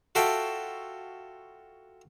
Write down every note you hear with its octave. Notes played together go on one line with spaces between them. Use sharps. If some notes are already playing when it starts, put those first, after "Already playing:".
F4 F#4 A4 E5 G5